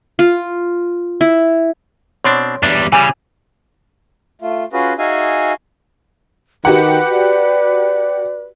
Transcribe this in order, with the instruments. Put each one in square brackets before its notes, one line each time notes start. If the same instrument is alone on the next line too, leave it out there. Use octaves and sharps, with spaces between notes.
[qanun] F4
E4
[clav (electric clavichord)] B2 C4 D4 [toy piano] C#5 C6
[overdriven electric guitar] E2 G3 [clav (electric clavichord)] D4
[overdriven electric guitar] C#3 C#4 [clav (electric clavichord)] E3 G3 [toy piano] G#5
[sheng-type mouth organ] A3 F4
C#4 F4 F#4 G#4 B4
D#4 F#4 G#4 E5 F5 G#5
[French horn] D#3 [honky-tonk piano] F#4 G4 F#5 [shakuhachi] B4
[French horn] D5